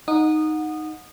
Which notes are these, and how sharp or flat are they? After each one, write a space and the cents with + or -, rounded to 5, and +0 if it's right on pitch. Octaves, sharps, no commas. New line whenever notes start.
D#4 +0 F#5 -20 D#6 -20